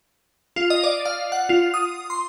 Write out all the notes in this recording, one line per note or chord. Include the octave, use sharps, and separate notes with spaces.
F4
D#5
D5
F5
F#5
F4
D#6
C6